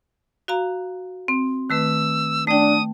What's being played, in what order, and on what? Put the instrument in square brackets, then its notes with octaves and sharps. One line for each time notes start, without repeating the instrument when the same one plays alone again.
[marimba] F#4 F5 A#5
C4
[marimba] D#3 A3 B4 [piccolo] E6
[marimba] A3 G5 [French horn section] D4 [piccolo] D#6